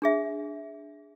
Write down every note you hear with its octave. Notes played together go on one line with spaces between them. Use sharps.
D4 G#4 E5